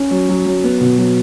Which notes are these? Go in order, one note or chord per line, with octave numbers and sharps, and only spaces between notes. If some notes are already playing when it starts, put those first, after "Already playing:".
Already playing: C#4
F#3
F#3
F#3
B3
B2
F#3